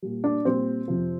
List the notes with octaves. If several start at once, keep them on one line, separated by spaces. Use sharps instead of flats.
A#2 G3
D4
A#2 G3 C4
F2 C3 F3